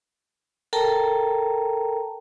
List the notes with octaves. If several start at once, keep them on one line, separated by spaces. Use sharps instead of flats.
A4 A#4 G5 A5 A#5